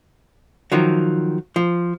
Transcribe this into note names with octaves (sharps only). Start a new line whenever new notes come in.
D#3 F3 F#3
F3